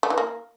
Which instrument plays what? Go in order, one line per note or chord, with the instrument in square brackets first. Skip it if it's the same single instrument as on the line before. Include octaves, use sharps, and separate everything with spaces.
[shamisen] A3
E3
A#3